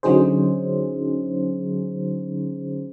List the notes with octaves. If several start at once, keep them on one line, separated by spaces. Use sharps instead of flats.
D3 F#3 C#4 D#4 G#4 C5